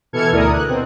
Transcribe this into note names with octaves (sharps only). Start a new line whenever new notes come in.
B2 E3 A4 F6 G#6 C#7
D2 B2 E4 A#4 D5 D#6
F#6
B2 C4